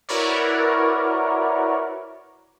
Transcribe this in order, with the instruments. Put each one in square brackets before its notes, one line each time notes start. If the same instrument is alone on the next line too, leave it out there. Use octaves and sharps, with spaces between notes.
[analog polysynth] E4 F#4 A#4 B4 C#5 D5